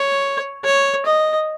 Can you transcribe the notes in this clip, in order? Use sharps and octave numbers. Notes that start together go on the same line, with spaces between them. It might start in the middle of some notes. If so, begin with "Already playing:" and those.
Already playing: C#5
C#5
D#5